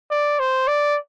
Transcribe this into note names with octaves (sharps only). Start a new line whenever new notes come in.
D5
C5
D5